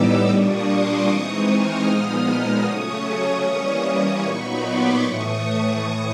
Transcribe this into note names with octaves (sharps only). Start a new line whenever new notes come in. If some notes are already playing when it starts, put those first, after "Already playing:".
Already playing: A2 E3 G3 B3 D#4 D6 E6
A#2 G3 A#3 D4 C#6 D#6
C6 D6
E3 G#3 C4 D#4 C#6 D#6
D#6 F6
A#2 F3 G#3 B3 D#4 D#6 F6
C#3 F#3 A3 C#4 C#6 D#6
E3 G3 A#3 C#4
A#2 F#3 B3 D#4 B5 C#6
C6 D6
A2 E3 A3 C#6 D#6
A2 E3